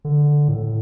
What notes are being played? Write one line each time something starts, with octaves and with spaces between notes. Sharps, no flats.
D3
A2